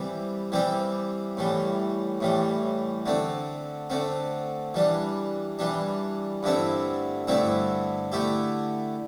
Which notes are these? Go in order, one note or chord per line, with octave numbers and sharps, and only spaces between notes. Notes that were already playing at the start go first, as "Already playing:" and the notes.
Already playing: E3 G3 C4 G4
E3 G3 C4 G4
A2 E3 G3
A2 E3 G3
D3 A3 C4
D3 A3 C4
E3 G3 D4
E3 G3 D4
G2 D3 A3 C4 E4
G2 D3 A3 C4 E4
D3 A3 E4 G4